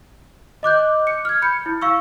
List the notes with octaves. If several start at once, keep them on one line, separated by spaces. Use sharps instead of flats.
D#5 D6 F#6 G6
C#7
F6 G#6
B5 G6 C#7
E4
F5 C#6 E6